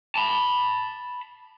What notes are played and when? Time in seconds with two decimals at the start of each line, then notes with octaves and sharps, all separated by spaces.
0.15 A5 B5